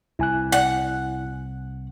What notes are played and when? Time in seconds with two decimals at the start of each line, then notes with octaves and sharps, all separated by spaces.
0.19 C2 E4 G#5 F#6
0.52 F#5